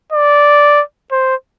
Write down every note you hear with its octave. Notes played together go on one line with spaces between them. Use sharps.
D5
C5